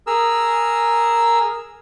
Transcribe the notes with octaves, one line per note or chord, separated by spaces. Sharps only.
G#4 A#4 E6